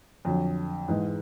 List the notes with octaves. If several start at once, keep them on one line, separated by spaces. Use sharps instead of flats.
F2 D3 F#3
G#2 E3 G#3